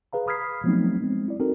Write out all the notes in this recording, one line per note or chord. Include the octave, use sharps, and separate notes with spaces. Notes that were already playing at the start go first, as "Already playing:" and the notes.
G#4 B4 F5 A#5
B5 D#6 F6 G#6 B6 C7
F3 F#3 A3 B3 C4 D#4
G#3 C4
E4 D5
C4 D#4 F#4 A4 A#4